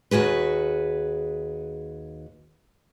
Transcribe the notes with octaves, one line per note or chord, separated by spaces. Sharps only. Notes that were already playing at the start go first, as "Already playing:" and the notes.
D#2 F#4 G#4 B4